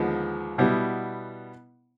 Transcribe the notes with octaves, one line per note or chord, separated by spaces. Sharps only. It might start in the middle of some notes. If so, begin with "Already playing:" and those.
Already playing: D#2 D3 F3 G#3 B3
B2 G3 B3 E4